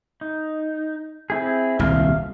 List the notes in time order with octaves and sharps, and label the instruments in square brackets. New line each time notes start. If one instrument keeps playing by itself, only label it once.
[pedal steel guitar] D#4
C4 E4 G#4
[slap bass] D#1 C2 [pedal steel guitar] E5 F5 F6